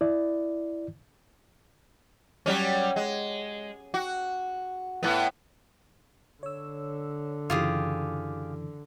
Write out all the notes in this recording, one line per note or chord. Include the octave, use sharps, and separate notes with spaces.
E4 D5
F#3 G3 C#4
G#3
F#4
A2 B3
D3 C#5 E6
F#2 C#3 E3 F4 G4 G#4